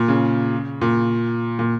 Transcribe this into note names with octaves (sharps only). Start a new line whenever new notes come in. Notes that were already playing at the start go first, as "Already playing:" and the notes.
Already playing: A#2
C#3
A#2
A#2